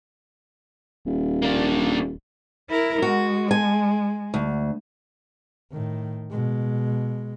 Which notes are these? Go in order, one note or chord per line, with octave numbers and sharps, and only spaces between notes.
D#1
A#3 D4
E4 A#4
G#3 F#4
G#5
D2
A2 D#3
B2 G#3